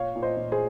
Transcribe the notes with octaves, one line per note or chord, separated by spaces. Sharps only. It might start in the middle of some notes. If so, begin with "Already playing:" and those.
Already playing: A#2 C#5 F5
A#2
C5 D#5
A#2
G#4 C5